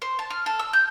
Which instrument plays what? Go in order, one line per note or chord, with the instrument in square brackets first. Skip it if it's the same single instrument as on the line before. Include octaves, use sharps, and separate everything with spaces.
[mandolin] C5
A5
F6
A4
E6
G6